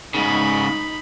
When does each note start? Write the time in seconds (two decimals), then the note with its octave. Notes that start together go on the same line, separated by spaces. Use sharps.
0.14 G#2 C#3 D#4 B5